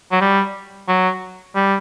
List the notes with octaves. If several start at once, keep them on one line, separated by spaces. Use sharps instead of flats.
F#3
G3
F#3
G3